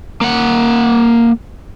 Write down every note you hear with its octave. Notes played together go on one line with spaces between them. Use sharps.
A#3 F#5